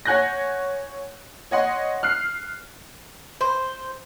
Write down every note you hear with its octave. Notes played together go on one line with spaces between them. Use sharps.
C#5 F#5 G#5 F#6 G6 A#6
C#5 D#5 F#5 C6
F6 F#6 C7
C5